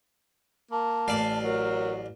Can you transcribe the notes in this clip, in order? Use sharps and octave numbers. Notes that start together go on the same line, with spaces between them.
A#3 A5
A1 D5 F5
F#3 A#4